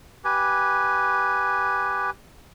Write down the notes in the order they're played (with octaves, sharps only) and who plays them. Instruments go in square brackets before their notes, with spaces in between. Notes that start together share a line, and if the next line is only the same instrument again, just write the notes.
[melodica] G4 B4 G#5